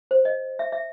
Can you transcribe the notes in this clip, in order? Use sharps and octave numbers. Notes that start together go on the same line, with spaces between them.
C5
D#5
E5
E5